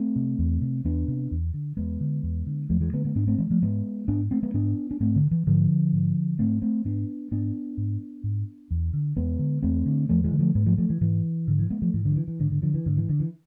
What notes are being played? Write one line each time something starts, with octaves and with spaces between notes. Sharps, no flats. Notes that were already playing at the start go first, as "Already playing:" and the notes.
Already playing: A3 C4
C3
E2
C3
E2 B3 D4
C3
E2
D3
E2 G#3 B3
D3
E2
D3
E2 F3 A3
E3 G#3
D3 G#3 B3
G#3 B3
G#2 B3 D4
A3 C4
E3 G#3
F3 A3
G#2 G#3 B3
G#2 B3 D4
A3 C4
G#3 B3
G#2 B3 D4
D4
G#2 A3 C4
D3
E3
G#2 D3 F3
G#2
G#2 A3 C4
A3 C4
G#2 B3 D4
G#2 B3 D4
G#2
G#2
E2
D3
E2 G#3 B3
D3
E2 A3 C4
D3
E2 F3 A3
E3 G#3
D3
F3 A3
G#2 G#3 B3
F3 A3
F3 A3
E3
G#2 E3
G#2 D3
E3
G#3 B3
F3 A3
G#2 E3
D3
F3
E3
E3
G#2 D3
D3
D3 F3
E3
G#2 D3
E3
D3
E3